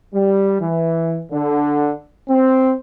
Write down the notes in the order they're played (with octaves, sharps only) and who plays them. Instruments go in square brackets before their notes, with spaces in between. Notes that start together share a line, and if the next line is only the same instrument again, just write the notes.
[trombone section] G3
E3
D3
C4